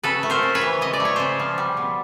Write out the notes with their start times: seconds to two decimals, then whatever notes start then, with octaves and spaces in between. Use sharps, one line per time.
0.04 C#3 A4 B4
0.23 A3
0.30 A#4 C5
0.43 C#3
0.55 B4 C#5
0.61 E3
0.81 C#3 D#5
0.93 D5
1.00 A3
1.05 C#5
1.16 C#3 C5 D5
1.39 F3
1.58 G3
1.77 B2